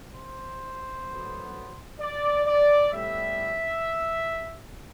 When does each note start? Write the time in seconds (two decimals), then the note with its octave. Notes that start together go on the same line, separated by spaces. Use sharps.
0.13 C5
1.06 D2 D3 F#3 B3
1.99 D5
2.46 D5
2.92 A2 G3 B3 E5